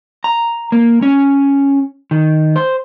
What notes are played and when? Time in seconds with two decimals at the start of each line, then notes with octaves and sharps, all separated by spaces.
0.24 A#5
0.72 A#3
1.02 C#4
2.11 D#3
2.56 C5